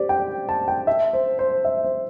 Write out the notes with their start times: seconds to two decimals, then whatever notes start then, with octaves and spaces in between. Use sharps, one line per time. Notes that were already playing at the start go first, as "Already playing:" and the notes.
Already playing: G4 C5 D5
0.09 G5
0.49 A5
0.68 G5
0.87 E5
1.13 C5
1.39 C5
1.64 E5
1.85 C5